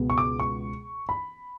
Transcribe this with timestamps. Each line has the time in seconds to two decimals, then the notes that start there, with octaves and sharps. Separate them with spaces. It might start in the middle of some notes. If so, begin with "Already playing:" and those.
Already playing: C#2 B2 G#3 B3
0.10 C#6
0.18 D6
0.40 C#6
1.09 B5